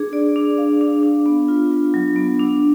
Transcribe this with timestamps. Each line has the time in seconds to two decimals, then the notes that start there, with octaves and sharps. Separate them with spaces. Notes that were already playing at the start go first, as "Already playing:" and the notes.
Already playing: D4 G#4
0.13 D5
0.36 D4
0.58 F5
0.81 D4
1.03 D4
1.26 B3
1.48 F4
1.71 F4
1.94 F#3
2.16 B3
2.39 D4